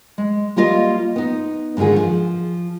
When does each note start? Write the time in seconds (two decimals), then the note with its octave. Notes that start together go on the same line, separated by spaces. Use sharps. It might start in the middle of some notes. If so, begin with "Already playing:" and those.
0.18 G#3
0.56 G3 A#3 F4 D#5 F5
1.16 B3 D#4
1.77 G#2 D3 D#3 F4 G#4
1.96 F3